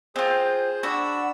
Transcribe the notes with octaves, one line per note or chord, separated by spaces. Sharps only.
C4 F4 G#4 C5
D4 F#4 B5 E6